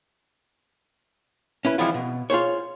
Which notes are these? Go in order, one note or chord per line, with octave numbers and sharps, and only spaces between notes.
C#4 E4 B4
E3 F3 G#3 C4 E4 F4
B2
F4 G#4 C5 C#5